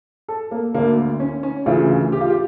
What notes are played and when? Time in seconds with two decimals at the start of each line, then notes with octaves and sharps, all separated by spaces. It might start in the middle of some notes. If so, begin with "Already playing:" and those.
0.28 A4
0.51 A#3
0.74 D2 D3 A#3
1.20 C#4
1.43 C#4
1.66 D2 C#3 E3 F4
2.12 G4
2.21 F4
2.30 G4